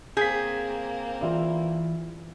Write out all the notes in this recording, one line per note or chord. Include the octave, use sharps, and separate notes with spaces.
A#3 C4 G#4 G6 B6
E3 E4 F4 D5